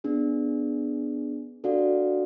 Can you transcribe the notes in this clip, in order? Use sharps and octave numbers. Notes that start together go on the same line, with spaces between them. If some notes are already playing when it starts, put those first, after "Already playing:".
B3 D4 G#4
D4 F#4 A4 D5 F5